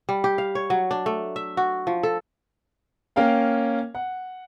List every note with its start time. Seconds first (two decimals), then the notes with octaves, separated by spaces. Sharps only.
0.09 G3
0.24 G4
0.38 F5
0.55 C#5
0.70 F#3
0.91 D4
1.06 A3
1.36 E5
1.57 F#4
1.87 F3
2.03 A4
3.16 A#3 C#4 A#4 F5 G5
3.95 F#5